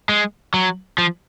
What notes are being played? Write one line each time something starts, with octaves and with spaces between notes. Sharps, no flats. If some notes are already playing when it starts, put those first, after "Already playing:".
G#3
F#3
F3